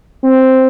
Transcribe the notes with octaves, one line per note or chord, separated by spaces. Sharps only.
C4